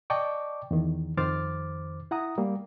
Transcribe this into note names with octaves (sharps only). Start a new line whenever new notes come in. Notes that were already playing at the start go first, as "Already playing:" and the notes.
D5 D#5 G5 A5 C#6 D6
E2 D#3
F2 D#3 C5 D6 F6 A6
E4 F#5 A#5 D#6
G3 A#3